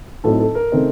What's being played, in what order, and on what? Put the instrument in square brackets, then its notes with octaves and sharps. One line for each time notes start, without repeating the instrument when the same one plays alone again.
[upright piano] A2 F#3 C4 D#4 A4
A4
A#4
C#3 A3 C4 D#4